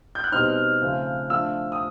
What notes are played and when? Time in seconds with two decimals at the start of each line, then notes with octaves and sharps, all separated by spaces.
0.15 G6
0.24 F#6
0.32 B2 G3 C4 D#4 F6
0.81 C#3 F3 A3 C4
1.30 F3 A3 D4 E6
1.72 D#6